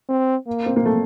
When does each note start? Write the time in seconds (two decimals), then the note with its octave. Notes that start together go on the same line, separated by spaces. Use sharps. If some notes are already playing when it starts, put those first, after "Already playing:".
0.09 C4
0.46 A#3
0.66 C4
0.76 A#3
0.86 A3